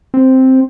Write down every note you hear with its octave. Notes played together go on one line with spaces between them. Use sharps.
C4